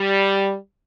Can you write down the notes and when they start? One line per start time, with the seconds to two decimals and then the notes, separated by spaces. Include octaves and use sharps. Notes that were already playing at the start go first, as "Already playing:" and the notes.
Already playing: G3